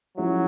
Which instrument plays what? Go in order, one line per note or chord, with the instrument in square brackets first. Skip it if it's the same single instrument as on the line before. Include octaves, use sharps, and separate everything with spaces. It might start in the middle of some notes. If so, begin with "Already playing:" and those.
[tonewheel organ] F3 G#3 C#4 E4 [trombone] F#3